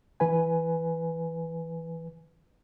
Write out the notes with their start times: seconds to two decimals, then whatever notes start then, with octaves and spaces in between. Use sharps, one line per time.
0.20 E3 B4 G#5